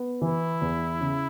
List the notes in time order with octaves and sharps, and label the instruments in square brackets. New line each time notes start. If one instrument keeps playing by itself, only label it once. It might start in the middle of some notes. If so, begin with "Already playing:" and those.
Already playing: [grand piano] B3
[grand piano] E3 [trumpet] E4
[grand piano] E2
C#3